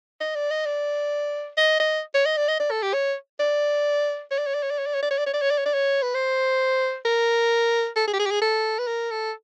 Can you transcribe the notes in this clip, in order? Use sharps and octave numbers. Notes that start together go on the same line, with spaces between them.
D#5
D5
D#5
D5
D#5
D#5
C#5
D#5
D5
D#5
D5
A4
G4
C#5
D5
C#5
D5
C#5
D5
C#5
D5
C#5
D5
C#5
D5
C#5
D5
C#5
D5
C#5
D5
C#5
D5
C#5
B4
C5
A#4
A4
G#4
G4
G#4
G4
G#4
A4
B4
A#4
A4